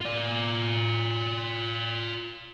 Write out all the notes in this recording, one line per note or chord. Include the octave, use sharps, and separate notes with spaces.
F4 D5